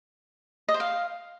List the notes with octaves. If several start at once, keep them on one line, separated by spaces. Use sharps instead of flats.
D#5
C5
F5